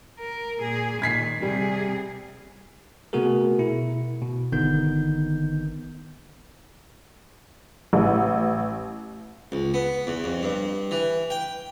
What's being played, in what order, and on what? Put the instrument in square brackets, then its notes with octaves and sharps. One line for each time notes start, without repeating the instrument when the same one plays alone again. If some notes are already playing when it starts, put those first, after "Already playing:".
[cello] A#4
A#2 G#4
[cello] A#2 D#3 [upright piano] G#6 B6 C7
[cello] C3 G#4 [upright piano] G3
[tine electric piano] C3 A3 B3 F#4 G#4 A#4
B2 E4
B2
G1 D3 D#3 B3 D#4 G6
[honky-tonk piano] A1
[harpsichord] C#2
B3
E2
F2
G2
E3
G5